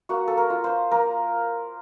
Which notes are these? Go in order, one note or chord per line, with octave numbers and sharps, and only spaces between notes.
A#3 F#4
A4
A#4
F4
C5
A#3 A#4